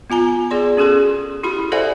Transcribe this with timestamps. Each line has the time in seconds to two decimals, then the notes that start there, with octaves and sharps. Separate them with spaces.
0.10 B3 F4 G#5 A#5
0.51 B3 G#4 D5 C6
0.77 C#4 F#4 G#4 A4 C6
1.43 E4 F#4 G4 B5
1.72 A4 C5 D5 E5 F#5 G#5